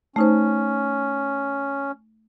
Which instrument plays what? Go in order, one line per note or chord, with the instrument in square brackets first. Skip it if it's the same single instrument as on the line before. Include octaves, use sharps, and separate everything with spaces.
[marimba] A3 D#4 C5 [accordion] C#4